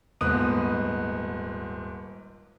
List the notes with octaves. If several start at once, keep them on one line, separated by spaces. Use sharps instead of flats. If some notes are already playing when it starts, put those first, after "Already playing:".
D#1 G#2 B3 D#6 F#6 D#7